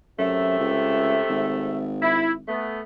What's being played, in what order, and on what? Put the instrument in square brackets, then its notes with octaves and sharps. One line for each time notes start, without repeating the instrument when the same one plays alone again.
[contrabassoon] F#2 [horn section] C3 A3 E5
[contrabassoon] C#2
G#1
[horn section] E4
A3 B3